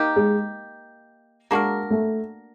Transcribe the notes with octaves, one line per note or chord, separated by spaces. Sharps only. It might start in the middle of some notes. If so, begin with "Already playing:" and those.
Already playing: A#3 D#4 G4
G#3
G#3 A#3 D4 F#4 A#4
A3